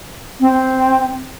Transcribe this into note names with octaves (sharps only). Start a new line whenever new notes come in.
C4